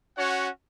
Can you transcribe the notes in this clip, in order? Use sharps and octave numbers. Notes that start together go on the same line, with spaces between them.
C#4 F#4 C#5 F#5